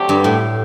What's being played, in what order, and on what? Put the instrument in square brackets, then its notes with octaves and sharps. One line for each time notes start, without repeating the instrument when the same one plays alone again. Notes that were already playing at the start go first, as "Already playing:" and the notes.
Already playing: [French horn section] D3 F#3 A3 C4 G4
[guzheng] G2
A2